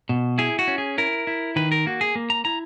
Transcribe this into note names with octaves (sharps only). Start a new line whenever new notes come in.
B2
E4 G#4
F#4
C#4
G#4
E4 A#4
E4
D#3 B4
A#4
A#3 F#4
G#4
A#3
A#5
E4 A#5